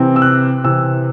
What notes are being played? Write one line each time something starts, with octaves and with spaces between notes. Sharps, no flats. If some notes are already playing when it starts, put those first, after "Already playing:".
Already playing: C3 E3 C4
E6
F#6
C3 E3 C4 E6